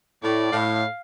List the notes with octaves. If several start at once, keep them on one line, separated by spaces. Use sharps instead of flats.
A2 D5
A2 F5